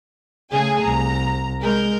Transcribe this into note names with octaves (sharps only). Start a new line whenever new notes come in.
C#3 A3 G#4 G#5
C2 A#5
G#3 A#4 G6